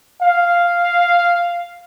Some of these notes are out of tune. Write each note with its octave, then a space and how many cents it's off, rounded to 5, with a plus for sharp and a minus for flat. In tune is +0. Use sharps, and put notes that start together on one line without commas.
F5 -5